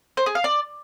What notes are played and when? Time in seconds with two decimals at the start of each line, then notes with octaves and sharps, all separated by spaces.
0.17 C5
0.26 G#4
0.35 F5
0.44 D5